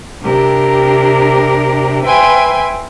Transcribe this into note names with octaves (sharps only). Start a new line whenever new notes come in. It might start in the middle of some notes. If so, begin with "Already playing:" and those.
C3 D4 G4 A#4
B4 C5 E5 G5 G#5 C6